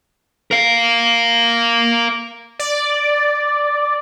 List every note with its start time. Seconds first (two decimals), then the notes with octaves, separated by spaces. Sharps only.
0.51 A#4 F5
2.59 D5